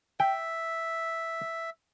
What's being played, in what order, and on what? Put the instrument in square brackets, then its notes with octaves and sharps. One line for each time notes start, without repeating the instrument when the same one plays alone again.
[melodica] E5 [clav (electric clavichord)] G5